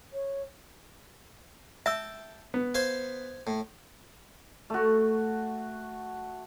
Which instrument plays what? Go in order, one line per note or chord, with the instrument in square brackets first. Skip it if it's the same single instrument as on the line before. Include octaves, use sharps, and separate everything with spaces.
[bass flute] C#5
[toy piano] E5 E6 [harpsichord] G5 A5
[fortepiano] B3
[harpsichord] C5 F5 G#5
A2
[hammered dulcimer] A3 F#4